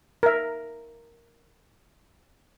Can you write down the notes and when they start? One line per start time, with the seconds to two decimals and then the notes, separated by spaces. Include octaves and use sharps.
0.23 A#4 E5